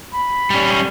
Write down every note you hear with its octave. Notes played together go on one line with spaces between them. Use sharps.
B5
G3 C#4